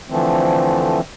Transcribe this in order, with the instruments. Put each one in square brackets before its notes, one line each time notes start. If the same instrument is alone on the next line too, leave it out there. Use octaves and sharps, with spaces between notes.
[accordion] D3 E3 F3 A3 C4